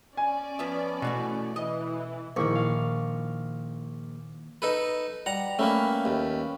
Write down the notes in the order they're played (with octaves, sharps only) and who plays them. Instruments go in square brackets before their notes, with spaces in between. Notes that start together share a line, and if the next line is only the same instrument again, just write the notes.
[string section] C#4 D5 [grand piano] G#5
[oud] F3 B3 E5
[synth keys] B2 [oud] E3 A3 F#4
[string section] E3 [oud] D#5
[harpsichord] A#1 [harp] D#3 E4 C#6
[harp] F5
[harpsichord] D#4 A4 B4
[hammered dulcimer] G3 [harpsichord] F#5 A#5
[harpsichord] A3 A#3 [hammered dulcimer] C#4 B4
[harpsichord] D#2